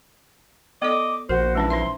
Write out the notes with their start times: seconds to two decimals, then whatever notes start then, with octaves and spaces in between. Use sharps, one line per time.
0.82 B3 A4 D5 D#5 D6
1.29 A#1 F#4 A#4 C5
1.55 E3 G#3 C#4 D#4
1.70 D#4 C5 E5 C6